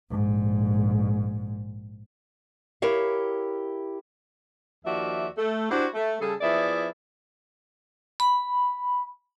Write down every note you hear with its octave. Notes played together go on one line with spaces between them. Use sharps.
A#1 G#2
E4 G4 A#4 C#5 F5
D#2 F3 F#4 D5 E5
A3
D4 E4 F#4 G4 C5
A3
C#3 G3 G#4 A4
F3 B3 E4 G#4 D5 E5
B5